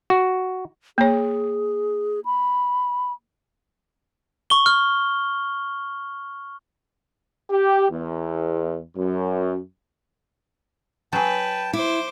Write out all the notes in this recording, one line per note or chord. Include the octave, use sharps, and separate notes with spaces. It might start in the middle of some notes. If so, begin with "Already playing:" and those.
F#4
A#3 G#4 C#5
B5
C#6 G7
F6
G4
E2
F#2
F#3 G#4 B4 G5 A5
E4 C5 D6